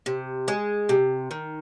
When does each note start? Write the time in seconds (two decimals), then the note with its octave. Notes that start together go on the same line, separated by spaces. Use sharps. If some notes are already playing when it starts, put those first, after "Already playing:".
0.06 C3
0.48 G#3
0.89 C3
1.31 D#3